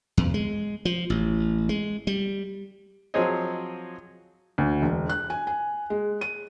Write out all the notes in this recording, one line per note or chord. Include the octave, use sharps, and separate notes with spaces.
E2
G#3
F3
A1
G#3
G3
F3 F#3 C4 G#4 C#5 D#5
D2
E1
F#6
G#5
G#5
G#3
D#7